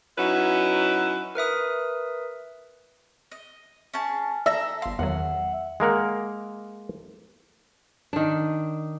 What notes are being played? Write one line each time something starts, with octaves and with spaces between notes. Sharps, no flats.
F#3 C#4 D#4 E4 F#4 B4
A#4 B4 E5 D#6
D#5
C#4 G#4 A5
A4 D5 E5 A#5 E6 A#6
G1 F5 C6
E2 D#3 F#3 F#5
G#3 A#3 A#4 F#5
D#3 D4